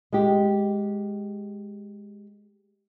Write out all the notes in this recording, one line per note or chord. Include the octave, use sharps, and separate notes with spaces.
G#3 G4